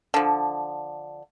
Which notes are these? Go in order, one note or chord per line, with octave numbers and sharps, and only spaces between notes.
D3 F3